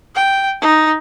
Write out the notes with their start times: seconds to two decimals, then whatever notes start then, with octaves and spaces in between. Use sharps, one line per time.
0.15 G5
0.62 D#4